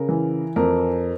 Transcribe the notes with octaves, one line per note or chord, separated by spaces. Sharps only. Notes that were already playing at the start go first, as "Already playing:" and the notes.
Already playing: C#3 A#4
E3
F2 A#4